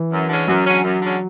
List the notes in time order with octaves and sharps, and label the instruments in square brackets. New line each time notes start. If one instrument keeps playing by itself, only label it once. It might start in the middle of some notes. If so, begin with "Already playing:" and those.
Already playing: [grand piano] E3
[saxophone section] F#2
D3 G#3 C#4
[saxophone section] F#2 [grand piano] F#3
[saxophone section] D3 G#3 C#4
F#2
D3 G#3 C#4